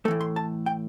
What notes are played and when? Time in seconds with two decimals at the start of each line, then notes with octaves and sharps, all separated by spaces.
0.05 A3 A4
0.08 A2 E3
0.21 C6
0.36 A5
0.66 G5